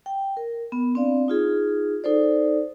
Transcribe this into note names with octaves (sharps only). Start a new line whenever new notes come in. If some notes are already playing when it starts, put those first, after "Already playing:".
G5
A#4
B3
C4 D4 D5 F5
D#4 F4 G#4
D#4 A4 C5 D5